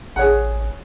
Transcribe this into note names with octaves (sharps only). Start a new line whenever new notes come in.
A1 G#4 C#5 F#5